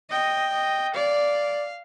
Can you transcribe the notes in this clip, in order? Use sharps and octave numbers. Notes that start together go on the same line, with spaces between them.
D#5 G5
D#5
D5 F5